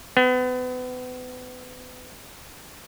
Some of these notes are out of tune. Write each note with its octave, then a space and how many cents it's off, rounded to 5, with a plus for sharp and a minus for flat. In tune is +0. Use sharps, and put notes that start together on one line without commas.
B3 +35